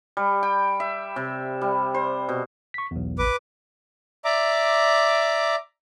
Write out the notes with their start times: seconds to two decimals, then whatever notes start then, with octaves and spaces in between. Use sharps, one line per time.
0.17 G3
0.43 G5
0.80 E5
1.16 C3
1.61 G3
1.94 C5
2.29 B2
2.74 C#6 B6
2.91 B1 E2
3.18 A1 B4 D6
4.25 D5 E5 A#5 D6